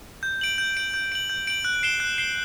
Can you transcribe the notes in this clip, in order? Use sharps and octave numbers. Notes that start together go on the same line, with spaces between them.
G6
D7 F#7
G6
D7 F#7
G6
D7 F#7
G6
D7 F#7
F#6
C7 E7 G7
F#6
C7 E7 G7